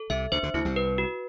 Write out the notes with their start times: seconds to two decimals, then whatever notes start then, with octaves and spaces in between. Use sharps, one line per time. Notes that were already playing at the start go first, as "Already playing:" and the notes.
Already playing: A4
0.10 C2 C3 E5
0.32 D2 D3 C5
0.43 D2 D3
0.54 D2 D3 E4
0.65 C2 C3
0.76 B4
0.98 F#4